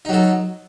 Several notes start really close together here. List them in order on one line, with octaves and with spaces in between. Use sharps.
D#4 F#3 A4